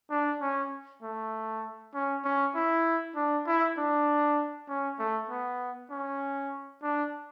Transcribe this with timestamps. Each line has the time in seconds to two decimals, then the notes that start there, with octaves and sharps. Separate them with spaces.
0.10 D4
0.41 C#4
1.02 A3
1.94 C#4
2.24 C#4
2.55 E4
3.16 D4
3.47 E4
3.78 D4
4.68 C#4
4.99 A3
5.29 B3
5.90 C#4
6.83 D4